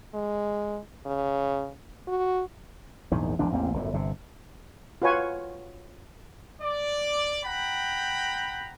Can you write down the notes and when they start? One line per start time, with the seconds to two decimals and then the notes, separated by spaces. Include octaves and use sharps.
0.14 G#3
1.06 C#3
2.08 F#4
3.12 A#1 E2 G#2 D#3
3.39 G#1 E2 F3 D4
3.52 A1 E2 A#3 C4
3.73 G1 F#2 A2
3.93 G1 C3
5.02 F4 F#4 B4 C#5 G#5 C#6
6.62 D5
7.45 F#5 G5 A#5 B5